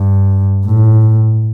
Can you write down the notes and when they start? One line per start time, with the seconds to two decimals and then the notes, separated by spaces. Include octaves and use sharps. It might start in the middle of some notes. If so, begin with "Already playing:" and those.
Already playing: G2
0.66 A2